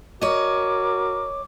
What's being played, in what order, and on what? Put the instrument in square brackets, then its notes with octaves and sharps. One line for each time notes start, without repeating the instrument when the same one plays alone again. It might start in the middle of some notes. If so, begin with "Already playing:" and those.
[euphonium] F#4 [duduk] A#4 [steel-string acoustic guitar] C#5 D#5 [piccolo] D6